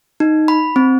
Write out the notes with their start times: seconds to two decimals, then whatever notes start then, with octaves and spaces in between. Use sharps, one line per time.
0.20 D#4
0.48 B5
0.76 C4